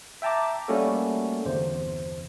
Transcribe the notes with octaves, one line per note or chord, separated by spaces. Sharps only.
E5 G5 A5 A#5 D6
G3 A3 A#3 C#4 F#4 A4
G1 E2 C3 C5